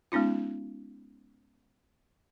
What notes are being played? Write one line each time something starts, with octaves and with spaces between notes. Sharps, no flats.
G#3 B3 C#4 D#4 F4